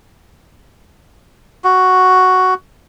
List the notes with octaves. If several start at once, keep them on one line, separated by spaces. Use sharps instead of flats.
F#4